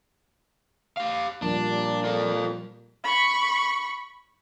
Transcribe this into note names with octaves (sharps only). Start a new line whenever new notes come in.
G4 F5
A#2 F3 G3 D4
F4 A4
B5 C#6